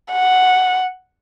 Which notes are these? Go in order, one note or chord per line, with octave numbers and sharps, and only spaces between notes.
F#5